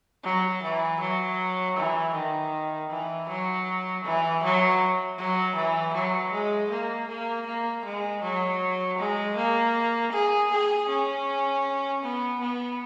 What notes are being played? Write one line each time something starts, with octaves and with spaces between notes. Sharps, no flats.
F#3
E3
F#3
E3
D#3
E3
F#3
E3
F#3
F#3
E3
F#3
G#3
A#3
A#3
A#3
G#3
F#3
G#3
A#3
G#4
G#4
C#4
B3
B3